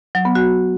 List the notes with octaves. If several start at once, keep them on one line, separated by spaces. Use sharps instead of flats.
F#3
B3
F#4